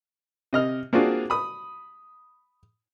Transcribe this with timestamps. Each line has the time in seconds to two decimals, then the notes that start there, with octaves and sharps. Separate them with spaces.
0.53 C3 D#5 F6
0.93 A#3 C4 D4 F4 F#4 G#4
1.30 B5 D#6